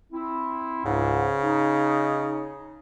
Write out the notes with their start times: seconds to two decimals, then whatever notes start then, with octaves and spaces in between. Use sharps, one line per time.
0.12 C4 E4
0.86 C#2 G#2 C#3
1.43 D#4